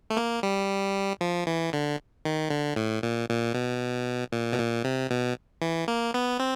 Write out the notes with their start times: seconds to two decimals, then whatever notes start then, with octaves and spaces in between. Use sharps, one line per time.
0.10 A3
0.17 A#3
0.43 G3
1.21 F3
1.47 E3
1.73 D3
2.25 D#3
2.50 D3
2.76 A2
3.03 A#2
3.29 A#2
3.54 B2
4.32 A#2
4.53 B2
4.59 A#2
4.84 C3
5.10 B2
5.62 E3
5.88 A#3
6.14 B3
6.39 C4